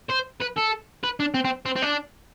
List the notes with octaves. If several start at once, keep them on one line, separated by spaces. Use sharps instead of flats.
C5
B4
A4
B4
D4
C4
C4
C4
C4
D4